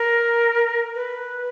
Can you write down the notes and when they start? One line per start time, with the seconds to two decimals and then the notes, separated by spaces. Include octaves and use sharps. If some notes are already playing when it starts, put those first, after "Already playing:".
Already playing: A#4
0.95 B4